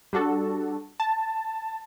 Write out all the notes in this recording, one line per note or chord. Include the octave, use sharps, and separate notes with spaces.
G3 D4 F#4 A4
A5